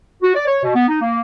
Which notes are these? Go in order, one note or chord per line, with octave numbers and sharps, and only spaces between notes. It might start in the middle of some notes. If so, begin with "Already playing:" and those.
F#4
D5
C#5
B2
B3
D#4
A#3